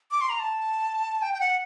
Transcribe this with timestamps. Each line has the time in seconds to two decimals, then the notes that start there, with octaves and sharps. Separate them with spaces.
0.11 D6
0.21 C6
0.29 A#5
0.39 A5
1.22 G5
1.34 G5
1.41 F#5